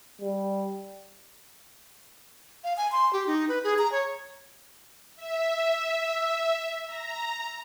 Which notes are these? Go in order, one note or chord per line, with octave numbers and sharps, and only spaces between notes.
G3
F5
G#5
C6
G4
D#4
B4
G#4
A#5
C#5
E5
A#5